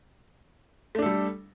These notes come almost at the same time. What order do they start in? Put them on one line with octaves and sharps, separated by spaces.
A3 D4 A4 G3